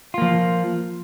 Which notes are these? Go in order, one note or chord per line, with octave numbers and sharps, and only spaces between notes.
F3 A#3 F4